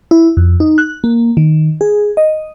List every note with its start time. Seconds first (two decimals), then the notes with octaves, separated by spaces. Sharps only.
0.11 E4
0.37 F2
0.60 D#4
0.78 F#6
1.04 A#3
1.37 D#3
1.81 G#4
2.17 D#5